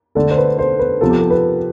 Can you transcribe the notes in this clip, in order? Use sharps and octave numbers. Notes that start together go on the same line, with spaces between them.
D3 A3 A4
C5
B4
C5
B4
C3 F3 B3 A4
G4
A4
B4